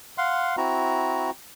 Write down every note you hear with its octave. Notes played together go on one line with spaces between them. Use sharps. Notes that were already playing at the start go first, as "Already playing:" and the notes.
F5 F#5 C6
C4 E4 F#4 A#5